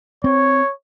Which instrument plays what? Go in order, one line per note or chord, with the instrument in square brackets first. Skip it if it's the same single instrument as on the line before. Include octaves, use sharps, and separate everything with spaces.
[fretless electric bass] C4 [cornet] C#5